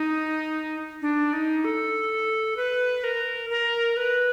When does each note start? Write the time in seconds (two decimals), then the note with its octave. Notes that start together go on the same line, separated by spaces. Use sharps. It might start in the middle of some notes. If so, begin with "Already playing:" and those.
Already playing: D#4
1.02 D4
1.33 D#4
1.64 A4
2.57 B4
3.04 A#4
3.50 A#4
3.97 B4